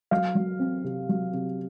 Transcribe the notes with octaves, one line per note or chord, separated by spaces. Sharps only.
F#3 F5
F#3
C4
C3
F#3
C3